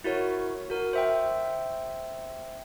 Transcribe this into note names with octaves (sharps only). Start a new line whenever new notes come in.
E4 F#4 A#4 C#5
F#4 A#4
C5 E5 G5